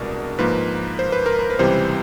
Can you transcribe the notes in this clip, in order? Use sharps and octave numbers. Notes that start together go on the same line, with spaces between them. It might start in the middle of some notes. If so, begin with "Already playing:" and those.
Already playing: C2 B2 G#3 D4 A#4
G#2 F3 A#3 B4
C5
B4
A#4
B4
B4
C#2 C3 E3 G3 C5